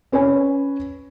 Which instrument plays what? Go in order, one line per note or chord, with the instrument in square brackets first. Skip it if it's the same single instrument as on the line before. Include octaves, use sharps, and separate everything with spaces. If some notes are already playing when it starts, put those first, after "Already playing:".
[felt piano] C#4 B4 C#5 G#5